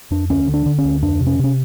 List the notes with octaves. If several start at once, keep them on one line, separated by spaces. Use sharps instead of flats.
F2 D4
D2 C#4
D3
D4
D3
C#4
D2
F2 D4
C3
C#4
C3 C#4